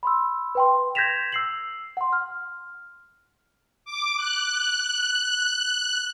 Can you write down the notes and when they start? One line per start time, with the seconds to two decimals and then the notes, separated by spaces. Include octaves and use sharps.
0.03 B5 C6 E6
0.55 B4 G5 C6
0.95 G6 G#6 A#6 B6 E7 F7
1.32 E6 C7 F#7
1.97 F#5 C6
2.13 F6
3.85 D6
4.17 F#6